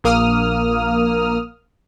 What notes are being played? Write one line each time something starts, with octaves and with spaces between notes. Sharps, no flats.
A#1 A#3 D#6 F6